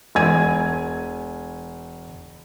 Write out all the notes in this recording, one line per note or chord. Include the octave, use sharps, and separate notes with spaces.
E1 G#5 G#6 D#7